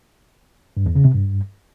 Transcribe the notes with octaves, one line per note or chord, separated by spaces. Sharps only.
G2
E2
C#3
C3
G2